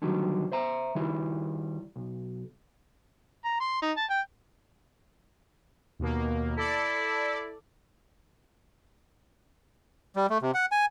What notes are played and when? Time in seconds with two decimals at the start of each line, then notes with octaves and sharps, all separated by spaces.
0.02 D3 D#3 F#3 G3
0.52 C5 E5 A#5
0.95 D#3 G3 E4
1.96 B1
3.45 A#5
3.61 C6
3.82 D#4
3.97 A5
4.10 G5
5.99 D#2 B2 A#3
6.57 E4 A4 D5
10.16 G3
10.30 A3
10.42 C3
10.54 F#5
10.72 G#5